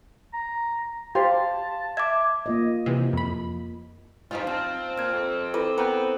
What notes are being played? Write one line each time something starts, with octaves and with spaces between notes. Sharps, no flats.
A#5
G4 C5 F5 A5 C6
E5 D6 G#6
A#3 F4 D#5
C3 E3
F2 B5
G2 F3 G3 D#4 F4
C4 A5 F6
A#2 F6 G#6
F2
E4 A4 B4 D6
B3 A#4 G5